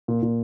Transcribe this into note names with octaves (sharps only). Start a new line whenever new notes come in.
A#2
A#2